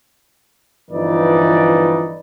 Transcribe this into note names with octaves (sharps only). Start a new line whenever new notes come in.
G1 E3 F3 D#4 B4 D5